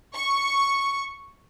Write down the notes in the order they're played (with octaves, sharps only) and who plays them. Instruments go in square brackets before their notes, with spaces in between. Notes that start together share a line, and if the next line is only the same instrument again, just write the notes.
[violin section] C#6